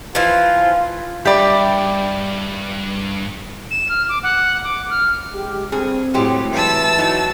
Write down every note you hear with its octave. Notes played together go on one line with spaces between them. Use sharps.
E3 F3 F4
G2 G4 D5 E5 G5 B5
E7
F6
D6
F#5
D6
F6
G#3 G4
G2 C4 G#4
A2 F#3 G#3 G4
E3 A5 E6
A2 F#3 D#4